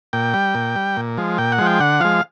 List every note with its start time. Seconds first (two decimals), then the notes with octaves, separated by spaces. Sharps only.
0.13 A#2 G5
0.34 G3
0.55 A#2
0.76 G3
0.97 A#2
1.17 F3 G#3
1.38 A#2 G5
1.52 F#5
1.58 F3 G#3
1.66 G5
1.80 D3 F#5
2.00 F3 G#3 F5